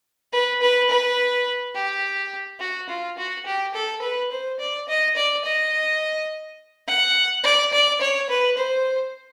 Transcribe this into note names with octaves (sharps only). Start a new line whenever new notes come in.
B4
B4
B4
G4
F#4
F4
F#4
G4
A4
B4
C5
D5
D#5
D5
D#5
F#5
D5
D5
C#5
B4
C5